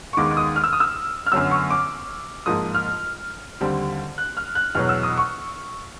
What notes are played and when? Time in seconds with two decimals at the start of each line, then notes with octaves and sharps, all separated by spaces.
0.13 C#6
0.17 D#2 D#3 G#3 B3 D6
0.31 D6
0.37 D#6
0.56 F6
0.64 E6
0.73 D#6
0.80 E6
1.26 F6
1.32 F#2 D3 F#3 B3 E6
1.51 C#6
1.70 D6
2.46 G#2 F3 A#3 D#6
2.75 F6
3.61 D#2 D3 G3 C4
4.18 F#6
4.37 F6
4.55 F#6
4.75 E2 B2 F#3 F6
4.89 E6
5.03 D#6
5.18 C#6